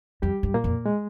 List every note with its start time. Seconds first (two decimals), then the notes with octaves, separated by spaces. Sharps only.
0.22 F2 G3 G4
0.43 G2
0.54 A#2 A#3
0.64 F2
0.86 G#3